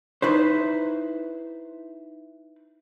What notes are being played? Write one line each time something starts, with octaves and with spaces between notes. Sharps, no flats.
D#4 E4 B4 C5